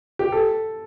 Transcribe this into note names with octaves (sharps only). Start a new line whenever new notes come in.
G4
A4